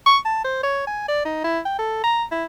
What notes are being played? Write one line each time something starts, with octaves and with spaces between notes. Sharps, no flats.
C#6
A5
C5
C#5
G#5
D5
D#4
E4
G5
A4
A#5
E4